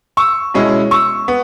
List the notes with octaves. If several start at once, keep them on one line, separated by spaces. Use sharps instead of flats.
C#6 E6
B2 G#3 C#4 E4
C#6 E6
B3